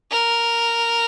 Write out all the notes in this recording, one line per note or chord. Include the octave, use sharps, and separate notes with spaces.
A#4